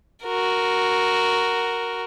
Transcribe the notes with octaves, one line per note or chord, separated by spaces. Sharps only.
F#4 A#4